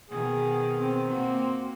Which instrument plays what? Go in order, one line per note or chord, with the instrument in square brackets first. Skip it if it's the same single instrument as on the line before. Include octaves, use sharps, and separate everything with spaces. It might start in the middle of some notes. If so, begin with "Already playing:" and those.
[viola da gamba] B2 D#3 [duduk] G#4
[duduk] C4
[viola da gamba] A#3 F#4